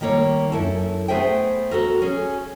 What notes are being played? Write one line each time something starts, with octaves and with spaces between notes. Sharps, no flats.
D#3 G3 A#3 C#5
F#2 E4 A4
A3 B3 G#4 C5 E5 G5
F#4 A4 A#4
C#4 G#4